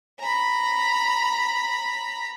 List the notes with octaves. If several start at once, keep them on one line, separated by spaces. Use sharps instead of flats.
A#5 B5